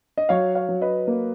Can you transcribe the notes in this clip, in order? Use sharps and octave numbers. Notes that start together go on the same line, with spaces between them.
D#5
F#3 C#5 F5
C#5 F5
F#3
B4 D#5
A#3